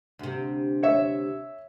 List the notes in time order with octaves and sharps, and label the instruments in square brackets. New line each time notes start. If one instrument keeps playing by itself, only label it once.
[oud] D2 C3
[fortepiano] C#5 E5